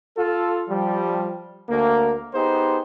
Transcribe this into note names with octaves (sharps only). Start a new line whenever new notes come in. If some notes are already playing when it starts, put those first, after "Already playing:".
F4 A4
F3 G3
D2 A#3
B3 D#4 G4 G#4 C5